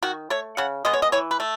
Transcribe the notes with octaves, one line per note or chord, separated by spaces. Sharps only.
D#3 F#4
A3 C#5
C#3 F#5
G#3 B3 D#5
C#5
D#5
E3 C#5
B4
A3